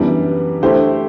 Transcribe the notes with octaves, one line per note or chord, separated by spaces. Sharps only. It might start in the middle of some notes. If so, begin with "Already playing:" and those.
Already playing: F#2 E3 G3 B3 D4
D3 A3 E4 G4 C5